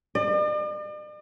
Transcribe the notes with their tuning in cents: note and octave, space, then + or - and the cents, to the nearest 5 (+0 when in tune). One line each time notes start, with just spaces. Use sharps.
D5 +45